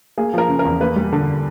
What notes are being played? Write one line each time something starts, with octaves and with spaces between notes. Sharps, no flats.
A#3 G#4
F3 A#4
C#3
A#4
E2
A#3 B4
G3
D3